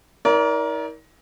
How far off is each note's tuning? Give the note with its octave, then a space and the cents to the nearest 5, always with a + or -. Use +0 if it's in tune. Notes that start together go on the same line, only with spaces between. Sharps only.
D#4 +45 A#4 +20 D5 -35